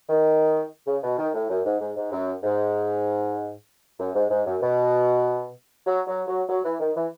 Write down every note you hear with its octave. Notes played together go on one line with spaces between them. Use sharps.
D#3
C#3
B2
D#3
A2
F#2
G#2
G#2
G#2
F#2
G#2
F#2
G#2
G#2
F#2
B2
F#3
F#3
F#3
F#3
E3
D#3
E3